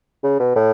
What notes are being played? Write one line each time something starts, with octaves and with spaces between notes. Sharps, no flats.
C#3
B2
A2